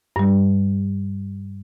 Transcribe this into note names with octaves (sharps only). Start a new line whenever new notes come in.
G2 G3